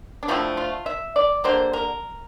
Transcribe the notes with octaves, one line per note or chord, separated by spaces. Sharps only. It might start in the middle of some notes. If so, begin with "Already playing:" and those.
D4
D3 F3 A3 C4 E4
F4
E5
D5
D3 G3 A#3 C5
A#4